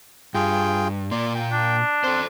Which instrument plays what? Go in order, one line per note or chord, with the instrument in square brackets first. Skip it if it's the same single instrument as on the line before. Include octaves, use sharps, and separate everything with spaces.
[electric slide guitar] G2 [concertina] F4 G#4 G5
[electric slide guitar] A#2 A#3 [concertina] D5 C6
[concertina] G5
[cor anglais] D4
[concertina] C4 [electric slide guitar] A4 C5